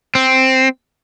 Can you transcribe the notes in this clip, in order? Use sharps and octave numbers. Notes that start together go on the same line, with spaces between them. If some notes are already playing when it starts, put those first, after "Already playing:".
C4